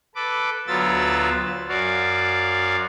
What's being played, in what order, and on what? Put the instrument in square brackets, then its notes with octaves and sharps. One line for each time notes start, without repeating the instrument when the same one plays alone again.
[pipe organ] A4 B4 D6
D2 F#3 B3 F4 E6 A6
F#2 F#4 D5 F5